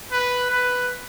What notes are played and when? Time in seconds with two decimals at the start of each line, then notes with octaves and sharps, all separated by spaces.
0.12 B4
0.50 B4